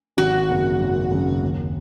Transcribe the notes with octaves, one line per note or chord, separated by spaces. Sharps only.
G#1 F#4
F#2 C#3 A#3
G#1
F#2 C#3 A#3
D#2